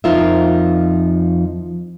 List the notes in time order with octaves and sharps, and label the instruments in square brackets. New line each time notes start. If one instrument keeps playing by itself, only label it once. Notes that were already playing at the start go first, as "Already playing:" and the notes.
[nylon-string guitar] F2 F3 D#4 F4 A#4 E5